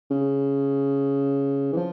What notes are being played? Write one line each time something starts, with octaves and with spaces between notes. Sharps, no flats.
C#3
E3
F3